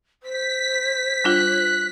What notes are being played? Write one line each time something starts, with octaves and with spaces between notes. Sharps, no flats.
C5 B6
G3 D4 F4 F#6